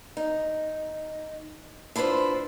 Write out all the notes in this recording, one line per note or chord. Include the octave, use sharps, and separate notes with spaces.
D#4
D4 E4 F4 B4 C5